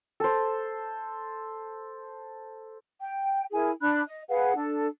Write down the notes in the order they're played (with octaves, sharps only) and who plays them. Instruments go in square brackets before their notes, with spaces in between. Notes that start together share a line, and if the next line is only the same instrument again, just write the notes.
[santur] A4 C5
[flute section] G5
E4 G#4 A#4 G#5
D4 B5 F#6
D#5
G#4 B4 F5 F#5
D4 A4